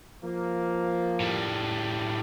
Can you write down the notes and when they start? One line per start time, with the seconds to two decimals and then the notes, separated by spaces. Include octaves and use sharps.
0.24 F3 A#3
1.20 A2 G3